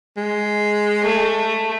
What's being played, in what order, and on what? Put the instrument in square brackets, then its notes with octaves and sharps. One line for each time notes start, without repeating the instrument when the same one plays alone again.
[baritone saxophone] G#3
[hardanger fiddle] A3